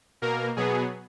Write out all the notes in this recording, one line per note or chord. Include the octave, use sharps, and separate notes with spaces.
B2 A#3 A#4
B2 F#3 B3 G#4